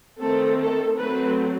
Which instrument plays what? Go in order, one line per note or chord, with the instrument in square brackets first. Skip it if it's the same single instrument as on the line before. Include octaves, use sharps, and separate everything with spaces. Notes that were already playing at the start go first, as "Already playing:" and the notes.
[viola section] D#3 A3 C4 A4
A4
F#3 A3 C4 B4